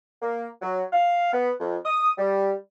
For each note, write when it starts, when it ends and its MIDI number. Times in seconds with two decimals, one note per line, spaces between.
0.22 0.47 58
0.62 0.83 54
0.93 1.31 77
1.33 1.51 59
1.60 1.77 41
1.85 2.11 87
2.18 2.53 55